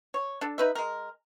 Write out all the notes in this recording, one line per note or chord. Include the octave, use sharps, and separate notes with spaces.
C#5
D4 A4
D#4 B4 E5
G#3 A#4